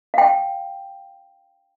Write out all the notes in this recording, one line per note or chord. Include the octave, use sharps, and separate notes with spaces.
F5 G5